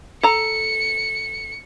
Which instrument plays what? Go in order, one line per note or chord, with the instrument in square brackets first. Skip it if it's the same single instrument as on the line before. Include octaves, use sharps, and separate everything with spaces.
[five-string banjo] A4 A#5 [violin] C#7